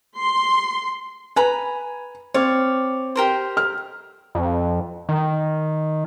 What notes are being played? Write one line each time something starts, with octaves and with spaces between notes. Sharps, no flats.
C6
B4 G#5 A#5 B5
C4 C#5 D5 F5
G4 A#4 C5
F6
F2
D#3